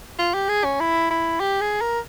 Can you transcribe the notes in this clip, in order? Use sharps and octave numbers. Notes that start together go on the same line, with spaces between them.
F4
G4
G#4
C#4
E4
E4
G4
G#4
A#4